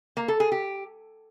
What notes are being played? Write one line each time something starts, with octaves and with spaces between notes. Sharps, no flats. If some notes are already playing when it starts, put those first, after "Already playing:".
A#3
A4
G#4
G4